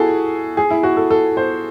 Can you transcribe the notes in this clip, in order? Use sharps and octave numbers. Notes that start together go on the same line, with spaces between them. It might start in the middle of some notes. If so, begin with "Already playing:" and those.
Already playing: E4 F#4 G#4 A4
G#4
E4
F#4
A4
A4
C5